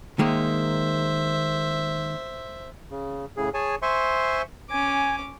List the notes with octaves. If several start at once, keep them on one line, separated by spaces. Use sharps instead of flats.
D#3 G#3 A#3 C5 E5
C#3
A2 C#3 G#4
G#4 C#5 G#5 A5
C5 E5 G#5 C6 C#6
C#4 G#5 D6